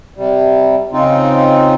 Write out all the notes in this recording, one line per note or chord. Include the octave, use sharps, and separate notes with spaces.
C3 G3
C#3 C4 D#4 F4